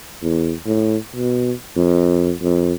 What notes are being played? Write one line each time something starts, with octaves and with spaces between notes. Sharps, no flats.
E2
A2
B2
F2
F2